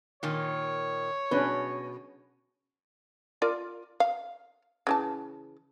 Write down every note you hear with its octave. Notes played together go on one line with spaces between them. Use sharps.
A#2 D#3 C#5
B2 C#4 D4 B4
F4 A#4 D5
F5
C#3 E3 A5